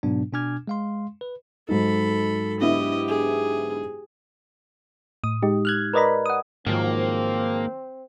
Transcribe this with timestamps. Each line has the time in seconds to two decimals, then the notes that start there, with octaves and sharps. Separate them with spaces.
0.03 G#2 B2 F#3 B3 D4
0.33 B2 D4 G#5 D6 F6 G#6
0.68 G#3 F5 C6
1.21 B4
1.69 G#2 F#3 D#4 A4 B5
2.60 D3 B3 E4 G4 D#5
3.08 G#4
5.24 A2 D#6
5.43 G#3 D#4 G4
5.65 F6 F#6 G#6
5.94 A#4 B4 D5 D#5 A#5 B5
6.26 F#5 D#6
6.67 G#2 D#3 F3 F#3 A#3 C4